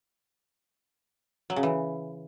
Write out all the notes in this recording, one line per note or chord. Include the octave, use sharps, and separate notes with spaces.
F#3
C#3
E3